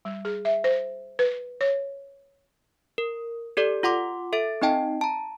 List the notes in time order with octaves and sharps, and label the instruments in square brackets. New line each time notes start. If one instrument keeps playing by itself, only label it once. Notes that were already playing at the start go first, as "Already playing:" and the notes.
[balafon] G3
G#4
E5
C5
B4
C#5
[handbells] A#4
G4 A4 D5
F4 F#5 C6 D6
A4 E5 A6 D7
C4 D#4 D#5 G5 A5
A5 A#5